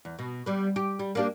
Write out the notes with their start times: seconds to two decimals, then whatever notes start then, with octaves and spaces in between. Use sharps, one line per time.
0.05 E2
0.19 B2
0.46 G3 B3
0.76 G4
0.99 G3
1.15 A#3 D4 G4